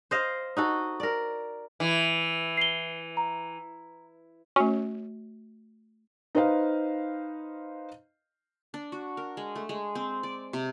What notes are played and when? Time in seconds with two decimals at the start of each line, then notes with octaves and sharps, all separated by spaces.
0.11 C5 D#5 F5
0.57 D#4 F#4 A4
1.00 A#4 D5
1.80 E3
2.57 C7 G7
3.17 A#5
4.56 A3 C#4 F#4
6.35 D#4 B4 C5 D#5 F5
8.74 D4
8.92 F#4
9.17 A#4
9.37 G#3
9.55 A3
9.69 G#3
9.95 C4
10.23 D5
10.53 C3